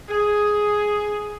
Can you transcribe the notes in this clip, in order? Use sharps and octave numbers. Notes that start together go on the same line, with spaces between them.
G#4